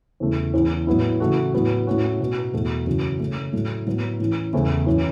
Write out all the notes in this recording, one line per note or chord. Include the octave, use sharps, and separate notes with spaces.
E2 C#3 A3 E4
E2 E3 C#4
A2 F#3 B3 E4
C#3 E3 A3 F#4
A2 F#3 B3 F#4
A2 A3 C#4 F#4
B2 B3 F#4
E2 B2 A3 F#4
F#2 C#3 E3 C#4 F#4
C#3 A3 C#4
A2 F#3 A3
A2 F#3 B3 F#4
A2 E3 C#4 E4
E2 C#3 A3 E4
F#2 E3 C#4